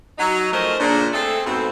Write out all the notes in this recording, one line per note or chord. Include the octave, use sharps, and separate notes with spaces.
F#3 D#4
F3 A3 C#4 A#4 C5 D#5
A#2 C#3 D4
A3 C4 G#4 A4
G#2 B2 A3 C4